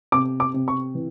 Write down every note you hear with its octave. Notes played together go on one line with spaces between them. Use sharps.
C3 D6
D6
C3
C#6
E3